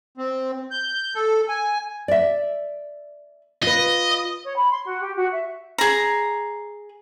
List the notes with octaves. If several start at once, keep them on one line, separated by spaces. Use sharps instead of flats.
C4
G6
A4
G#5
D5 E5
F4 B4 D#5
C#5
B5
C6
F#4
G4
F#4
E5
G#4 A#5